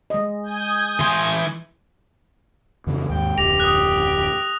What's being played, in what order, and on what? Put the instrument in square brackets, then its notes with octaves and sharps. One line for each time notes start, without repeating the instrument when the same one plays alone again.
[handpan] G#3 D#5
[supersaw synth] G#5 D#6 G6
[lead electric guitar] E3 C6
[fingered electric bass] F2 C#3 E3
[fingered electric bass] D#2 G#2 [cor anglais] G5
[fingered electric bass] D1 F2 [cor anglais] G4 [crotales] A#6 F7
[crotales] D#6 F#6